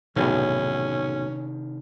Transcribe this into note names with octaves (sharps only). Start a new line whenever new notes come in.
B1 E2 A2 C3 D#3 C#4